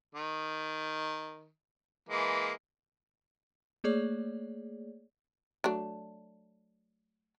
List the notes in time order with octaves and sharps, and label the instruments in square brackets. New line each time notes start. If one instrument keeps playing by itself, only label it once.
[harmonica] D#3
E3 G#3 A#3
[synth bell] A3 A#3 G#4 C#5 D5
[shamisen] F#3 A3 D4